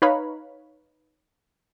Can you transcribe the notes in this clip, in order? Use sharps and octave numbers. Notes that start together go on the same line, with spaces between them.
D#4 B4 C#5 F5 A#5 B5